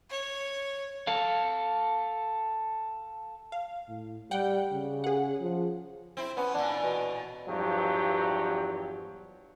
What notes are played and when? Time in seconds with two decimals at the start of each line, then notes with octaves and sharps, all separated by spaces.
0.11 C#5
1.07 A4 F5
3.52 F5
3.88 A2
4.31 G3 F#5 G5
4.72 C#3
5.04 G#4 F#5
5.41 F3
6.17 C4 E4
6.37 B3 C#4
6.54 A#2 E3 D4
6.83 B2
7.48 E2 G2 F3 F#3 G4